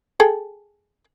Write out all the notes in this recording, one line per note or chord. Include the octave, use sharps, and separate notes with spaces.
G#4 A4 G5